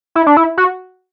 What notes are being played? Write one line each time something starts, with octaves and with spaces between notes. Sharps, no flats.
E4
D4
E4
F#4